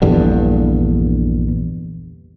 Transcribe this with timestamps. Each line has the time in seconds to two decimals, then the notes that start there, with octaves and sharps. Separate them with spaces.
0.02 A#1 E2 G2 D3